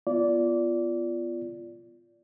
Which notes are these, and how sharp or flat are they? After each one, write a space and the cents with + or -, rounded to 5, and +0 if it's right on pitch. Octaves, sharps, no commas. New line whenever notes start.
B3 +0 F4 -15 D5 -15